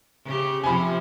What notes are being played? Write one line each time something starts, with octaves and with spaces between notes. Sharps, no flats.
C#3 G4
C3 F3 C4 G#5 B5